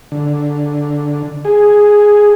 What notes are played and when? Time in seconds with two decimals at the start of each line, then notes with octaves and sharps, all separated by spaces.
0.12 D3
1.45 G#4